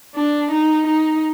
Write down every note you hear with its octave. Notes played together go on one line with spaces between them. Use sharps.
D4
D#4
D#4